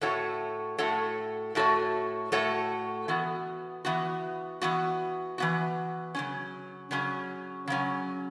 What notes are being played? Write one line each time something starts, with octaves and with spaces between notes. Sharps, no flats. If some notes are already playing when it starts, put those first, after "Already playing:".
A2 A3 F#4 A4 C#5
A2 A3 F#4 A4 C#5
A2 A3 F#4 A4 C#5
A2 A3 F#4 A4 C#5
E3 B3 F#4
E3 B3 F#4
E3 B3 F#4
E3 B3 F#4
C#3 F#3 C#4
C#3 F#3 C#4
C#3 F#3 C#4